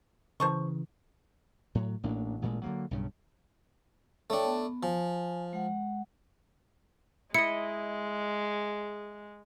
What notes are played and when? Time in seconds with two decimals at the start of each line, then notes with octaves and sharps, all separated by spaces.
0.40 C#3 E3 C5 A5 C#6
1.75 A2 F#3
2.03 A1 A2 A#3 D4
2.42 A1 A#2 G3 G#3
2.63 D3 F#3 G3 A#3
2.91 B1 G2 C#3
4.30 A3 D4 C#5 G5
4.45 B3
4.83 F3 G#5
5.53 G#3 F#5
7.34 G#3 E4 D#5 C#7